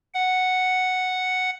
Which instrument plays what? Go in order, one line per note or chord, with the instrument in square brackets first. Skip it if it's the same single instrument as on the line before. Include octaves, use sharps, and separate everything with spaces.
[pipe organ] F#5